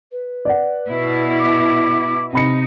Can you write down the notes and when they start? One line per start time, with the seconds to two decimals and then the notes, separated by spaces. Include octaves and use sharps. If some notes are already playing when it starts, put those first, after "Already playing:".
0.11 B4
0.45 D5 F#5
0.89 B2 E4
1.39 D6
2.33 C3 D#4 B5 C#7